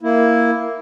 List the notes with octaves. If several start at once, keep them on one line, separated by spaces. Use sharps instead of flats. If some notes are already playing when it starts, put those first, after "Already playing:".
A#3 E4